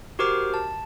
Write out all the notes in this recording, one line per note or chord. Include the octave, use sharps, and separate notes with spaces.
F#4 G4 A#4 C5 D6 F6
A5